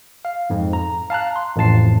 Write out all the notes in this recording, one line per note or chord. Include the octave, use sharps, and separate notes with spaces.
F5
F2 G#2
A#5
F5 A5 A#5 F#6
C6
A1 F2 A2 A5 C7